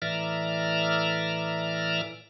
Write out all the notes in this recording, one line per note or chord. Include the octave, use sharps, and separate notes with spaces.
A2 E3 D5 E5 A#5 F6